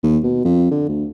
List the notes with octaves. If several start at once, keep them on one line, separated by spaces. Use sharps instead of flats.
D#2
B2
F2
D3
D2